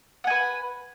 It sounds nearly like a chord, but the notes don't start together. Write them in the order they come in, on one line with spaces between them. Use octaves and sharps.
F#5 G#5 B4